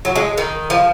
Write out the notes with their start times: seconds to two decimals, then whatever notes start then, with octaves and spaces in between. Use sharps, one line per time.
0.05 F#3
0.16 G#3
0.38 D#3
0.70 F3